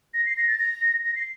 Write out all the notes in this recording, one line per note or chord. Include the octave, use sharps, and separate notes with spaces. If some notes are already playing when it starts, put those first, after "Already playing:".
A#6
C7
A#6
A6
A#6
A#6
C7